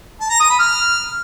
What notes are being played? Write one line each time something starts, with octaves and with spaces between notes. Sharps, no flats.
A5
A#5
D#6
B5
F6